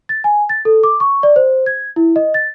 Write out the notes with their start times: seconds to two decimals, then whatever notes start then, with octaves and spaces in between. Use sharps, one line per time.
0.09 A6
0.24 G#5
0.49 A6
0.65 A4
0.84 D6
1.00 C#6
1.23 D5
1.36 C5
1.66 G#6
1.96 E4
2.16 D#5
2.34 A6